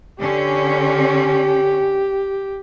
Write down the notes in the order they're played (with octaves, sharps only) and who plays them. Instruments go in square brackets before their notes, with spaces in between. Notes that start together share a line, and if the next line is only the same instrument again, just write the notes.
[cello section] D3 C#4 [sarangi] G4